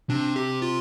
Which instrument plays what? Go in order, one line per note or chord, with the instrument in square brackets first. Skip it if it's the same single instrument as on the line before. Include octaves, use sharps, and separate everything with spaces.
[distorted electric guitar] C3 [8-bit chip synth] D4
[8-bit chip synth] G4
F4